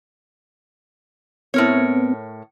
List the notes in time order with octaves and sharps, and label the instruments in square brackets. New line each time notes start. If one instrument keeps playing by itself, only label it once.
[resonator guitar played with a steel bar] A2 A#4 C#5 [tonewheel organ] B3 C4